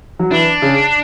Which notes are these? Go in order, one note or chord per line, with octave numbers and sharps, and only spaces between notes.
F#3
E3 D4
C#3